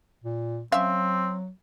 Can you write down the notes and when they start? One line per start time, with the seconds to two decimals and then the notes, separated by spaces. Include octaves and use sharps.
0.24 A#2
0.72 F#3 C4 C#4 E5 F5